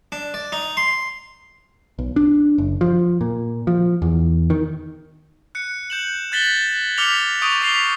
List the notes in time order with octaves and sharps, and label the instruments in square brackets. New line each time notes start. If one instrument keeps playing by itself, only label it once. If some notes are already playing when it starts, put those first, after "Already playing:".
[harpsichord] D4
D5
D#4
C6
[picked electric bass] B1
D4
F#1
F3
A#2
F3
E2
D#3
[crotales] F#6 C#7
G6 E7 F#7
F#6 G#6 A6 B6 F#7 G7
D6 F6 B6 C#7 F7 G7
C#6 D#6 G6 D7 D#7 F7
D6 B6 C7 F7 G7